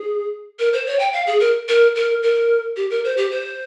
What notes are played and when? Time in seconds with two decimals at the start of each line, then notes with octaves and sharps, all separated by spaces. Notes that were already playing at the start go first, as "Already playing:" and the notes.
Already playing: G#4
0.59 A#4
0.73 C5
0.87 C#5
0.99 G5
1.13 F5
1.27 G#4
1.40 A#4
1.68 A#4
1.95 A#4
2.23 A#4
2.76 G4
2.90 A#4
3.04 C5
3.17 G4
3.32 C5